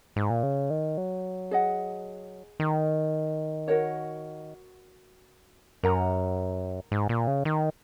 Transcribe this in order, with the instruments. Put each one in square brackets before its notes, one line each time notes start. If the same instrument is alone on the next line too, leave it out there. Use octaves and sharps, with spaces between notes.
[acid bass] G#2
A#2
C#3
D#3
F#3
[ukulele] G#4 D#5 F#5
[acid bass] D#3
[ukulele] F#4 A#4 C#5 F#5
[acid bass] F#2 [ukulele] A#4 F#5 A#5
[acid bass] G#2
A#2
C#3
D#3